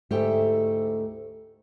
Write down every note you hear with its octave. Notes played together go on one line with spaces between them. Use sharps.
D2 G#2 A3 E4 G4 G5